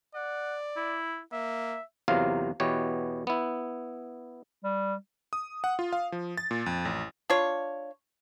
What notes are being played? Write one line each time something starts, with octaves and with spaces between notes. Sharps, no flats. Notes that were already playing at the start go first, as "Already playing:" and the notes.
D5 F#5
E4
A#3 E5
E2 C3 F#3 A#3 F4 F5
E2 B2 E3 B3 G4 C#5
B3 E4
G3
D#6
F#5
F4
F5
F3
A6
A#2
F2
A1
D4 F4 C#5